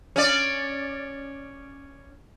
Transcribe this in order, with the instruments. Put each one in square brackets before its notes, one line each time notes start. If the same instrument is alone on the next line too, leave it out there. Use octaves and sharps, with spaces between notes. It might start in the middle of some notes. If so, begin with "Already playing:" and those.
[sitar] C#4 D5